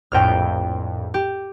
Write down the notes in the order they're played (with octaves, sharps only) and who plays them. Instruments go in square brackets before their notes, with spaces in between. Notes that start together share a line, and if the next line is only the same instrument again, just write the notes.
[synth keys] A#1 F2 A2 [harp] G5 F6
[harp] G4